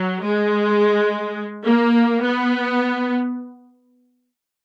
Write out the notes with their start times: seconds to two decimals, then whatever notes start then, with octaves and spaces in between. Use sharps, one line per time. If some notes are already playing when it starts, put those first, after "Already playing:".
Already playing: F#3
0.22 G#3
1.66 A#3
2.23 B3